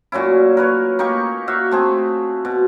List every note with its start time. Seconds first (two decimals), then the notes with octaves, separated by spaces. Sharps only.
0.12 A#2 F#3 C#4 E4
0.57 A#4 B4 C#5
0.99 A#3 D#4 G4 C#6
1.48 F#4 E5 F5
1.71 A3 C4 G#4
2.45 B2